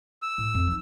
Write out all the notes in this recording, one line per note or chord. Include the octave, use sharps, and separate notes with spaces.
E6
A2
F2
F3 D#4